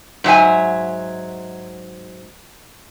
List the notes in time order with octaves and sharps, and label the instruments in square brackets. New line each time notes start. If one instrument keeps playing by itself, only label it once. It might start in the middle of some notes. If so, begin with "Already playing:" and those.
[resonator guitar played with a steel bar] G#2 F#3 E5 G#5